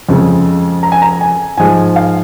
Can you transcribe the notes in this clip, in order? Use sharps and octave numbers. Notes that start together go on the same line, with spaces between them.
F2 C#3 G#3
A#5
G#5
A#5
G#5
G#2 F3 G#3 G#5
F5